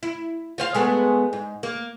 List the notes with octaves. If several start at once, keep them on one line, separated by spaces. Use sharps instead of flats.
E4
F4 C5 F5
G#3 A3 B3
G#2
A#3